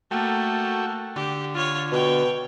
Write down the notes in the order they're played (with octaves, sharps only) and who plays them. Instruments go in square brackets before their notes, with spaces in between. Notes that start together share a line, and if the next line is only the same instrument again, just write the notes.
[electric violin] A3 A#3 [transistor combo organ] F#4 A4 G5
[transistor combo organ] D3 [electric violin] G4
[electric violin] F4 C#5
[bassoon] B2 [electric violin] C#5 G5